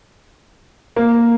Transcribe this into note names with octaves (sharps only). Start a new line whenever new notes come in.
A#3